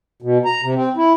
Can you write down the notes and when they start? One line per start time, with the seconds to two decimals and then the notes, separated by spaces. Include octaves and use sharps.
0.22 B2
0.45 A#5
0.62 C3
0.75 C4
0.96 E4